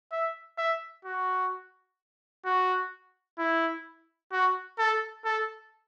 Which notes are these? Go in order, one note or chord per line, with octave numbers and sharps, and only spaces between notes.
E5
E5
F#4
F#4
E4
F#4
A4
A4